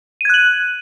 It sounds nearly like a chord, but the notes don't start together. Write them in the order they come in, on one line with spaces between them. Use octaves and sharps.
D#7 G#6 F#6 F#7